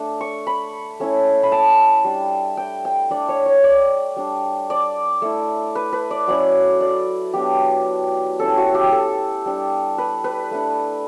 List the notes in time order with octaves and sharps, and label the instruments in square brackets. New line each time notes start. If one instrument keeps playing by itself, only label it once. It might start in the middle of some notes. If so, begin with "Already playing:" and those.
Already playing: [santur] A3 D4
C#6
B5
A3 C#4 E4
B5
A5
G3 D4
G5
G5
A3 D4 D5
C#5
C#5
D5
G3 D4
D5
A3 E4
B4
B4
D5
F#3 C#4 E4 D5
D5
F#3 B3 D4 G4
G3 C#4 E4 A4
F#4
G4
A4
G3 D4
B4
B4
A3 D4